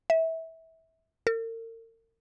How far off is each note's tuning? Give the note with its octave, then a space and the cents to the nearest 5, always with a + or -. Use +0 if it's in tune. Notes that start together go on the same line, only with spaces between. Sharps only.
E5 -25
A#4 -45